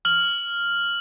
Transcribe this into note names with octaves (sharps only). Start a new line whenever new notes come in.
F6 F#7